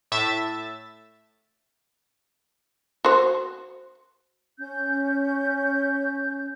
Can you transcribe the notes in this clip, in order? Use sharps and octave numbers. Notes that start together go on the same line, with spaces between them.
A2 E5 A6
F#4 C5
C#4 G6